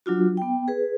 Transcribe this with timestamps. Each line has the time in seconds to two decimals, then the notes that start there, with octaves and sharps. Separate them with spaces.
0.06 F#3 D4 F4 F#4
0.37 B3 G5
0.68 G#4 B4